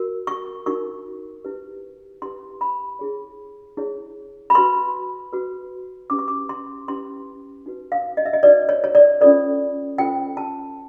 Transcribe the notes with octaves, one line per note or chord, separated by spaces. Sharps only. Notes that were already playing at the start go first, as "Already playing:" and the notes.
Already playing: F#4 A#4
C#6
D#4 F#4 A#4 C#6
E4 G4 B4
E4 G4 B4 C6
B5
E4 G#4 C#5
E4 G#4 C#5
B5
F#4 B4 C6
F#4 B4
C#4 E4 G4 B4 D6
C#6
D6
C6
C#4 E4 G4 B4 C6
D#4 F#4 B4
F5
D#5
E5
D#5
D#4 F#4 B4 D5
C#5
C#5
D5
C#4 F4 A4 C5 D5
C#4 F4 A4 C5 G5
A5